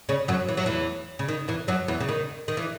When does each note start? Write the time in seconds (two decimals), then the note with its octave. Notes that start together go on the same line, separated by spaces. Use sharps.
0.09 C#3 C#4
0.28 F#2 F#3
0.49 E3
0.57 F#3
0.66 E2 E3
1.19 C#3
1.28 D#3
1.48 E2 E3
1.68 F#2 F#3
1.88 E2 E3
2.00 C#3
2.09 D#3
2.48 D#3
2.57 E3